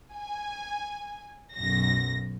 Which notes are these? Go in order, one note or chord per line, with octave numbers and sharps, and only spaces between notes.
G#5
B1 F#2 A#6